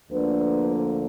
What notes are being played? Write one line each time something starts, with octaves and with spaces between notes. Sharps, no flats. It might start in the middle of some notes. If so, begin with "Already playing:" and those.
D2 D3 F3 A#3 D4 B4